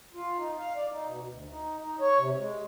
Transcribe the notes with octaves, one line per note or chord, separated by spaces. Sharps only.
F4
D#4
F5
D5
D#4
B2
D2
D#4
D#4
C#5
C3
G#3